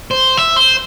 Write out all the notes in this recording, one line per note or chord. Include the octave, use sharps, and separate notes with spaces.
C5
E5
C5